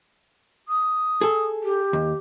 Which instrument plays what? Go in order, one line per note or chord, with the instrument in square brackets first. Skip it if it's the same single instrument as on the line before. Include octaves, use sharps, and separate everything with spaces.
[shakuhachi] D#6
[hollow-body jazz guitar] G#4 A4
[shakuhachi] G4
[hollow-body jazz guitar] D#2